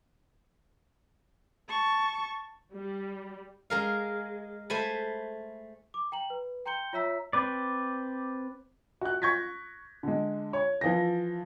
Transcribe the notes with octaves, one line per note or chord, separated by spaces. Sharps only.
A5 C#6
G3
G#3 A#4 F5
A3 C5 G#5 B5
D6
G5 A#5 F#7
B4
G5 A#5 C6 G6 C#7 G7
F4 C#5 E5 A#5 E6 B6
C4 B4 D5
F#4 F#6
C#6 G6 G#6 A#6 B6
D3 G#3
C#5
E3 F3 A#6